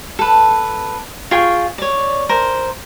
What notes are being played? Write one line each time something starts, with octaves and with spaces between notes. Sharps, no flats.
A4 B4
F4 G#4 G5 C#6
C#5 D5
A#4 C5